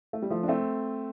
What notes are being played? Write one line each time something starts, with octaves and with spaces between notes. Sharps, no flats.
A3
G3
F3 A3
D4
A3 C4